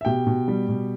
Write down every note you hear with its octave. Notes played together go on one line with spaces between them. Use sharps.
E5
B2 G4 G5
B2
G3
B2